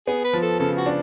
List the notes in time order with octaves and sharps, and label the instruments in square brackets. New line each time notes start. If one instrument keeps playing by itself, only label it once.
[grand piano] B3 [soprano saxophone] G#4
[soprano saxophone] B4
[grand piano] F3
[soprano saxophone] A4
[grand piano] C#3 [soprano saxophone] A4
[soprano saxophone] F#4
[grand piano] D4